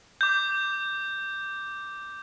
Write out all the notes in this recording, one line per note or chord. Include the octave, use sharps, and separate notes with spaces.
D6 G6